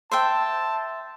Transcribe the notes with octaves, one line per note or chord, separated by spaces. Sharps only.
C5 E5 G5 A5